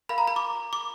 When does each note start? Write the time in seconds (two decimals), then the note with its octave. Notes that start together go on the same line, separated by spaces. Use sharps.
0.09 A#4 F5 B5
0.18 A#5
0.27 B5
0.36 D6
0.73 D6